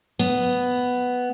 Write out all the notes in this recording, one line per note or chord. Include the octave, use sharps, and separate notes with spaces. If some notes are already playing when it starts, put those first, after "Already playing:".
B3